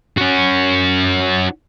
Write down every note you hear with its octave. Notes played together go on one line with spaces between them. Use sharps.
C#4 F#4